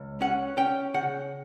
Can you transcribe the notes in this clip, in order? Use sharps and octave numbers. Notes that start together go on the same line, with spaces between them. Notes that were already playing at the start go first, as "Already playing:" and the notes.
Already playing: C#2
C#4 F#5
C#4 G5
C#3 F#5